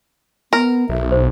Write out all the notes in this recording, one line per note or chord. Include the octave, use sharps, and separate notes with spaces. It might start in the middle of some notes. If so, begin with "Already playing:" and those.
B3 A#4
B1 E5
C5